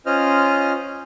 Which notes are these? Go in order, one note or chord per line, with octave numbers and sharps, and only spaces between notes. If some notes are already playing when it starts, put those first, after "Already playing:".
C#4 F4 C5 D#5 F6